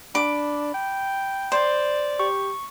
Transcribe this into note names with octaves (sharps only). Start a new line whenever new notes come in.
D4 B5 D6
G5
C5 D5
G4 C#6